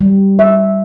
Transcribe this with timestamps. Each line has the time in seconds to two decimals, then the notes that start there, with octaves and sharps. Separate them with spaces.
0.01 G3
0.39 E5